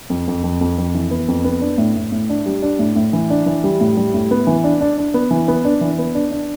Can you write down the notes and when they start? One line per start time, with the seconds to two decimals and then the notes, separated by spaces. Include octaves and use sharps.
0.10 F2
0.27 F2
0.44 F2
0.61 F2
0.78 F2
0.94 E3
1.11 B3
1.28 F2
1.44 B3
1.61 D4
1.78 A2
1.96 A2
2.12 A2
2.29 D4
2.46 G3
2.62 D4
2.79 A2
2.96 A2
3.13 E3
3.30 D4
3.46 E3
3.64 G3
3.81 A2
3.97 G3
4.14 A2
4.31 B3
4.47 E3
4.64 D4
4.81 D4
4.98 D4
5.14 B3
5.31 E3
5.48 B3
5.65 D4
5.81 E3
5.99 B3
6.15 D4
6.31 D4